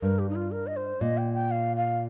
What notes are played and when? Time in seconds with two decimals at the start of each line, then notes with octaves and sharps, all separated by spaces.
0.02 G2 A#4
0.19 G4
0.29 D#4
0.36 F4
0.51 A#4
0.67 D#5
0.76 C5
1.01 A#2 D#5
1.18 G5
1.34 G5
1.51 F5
1.77 F5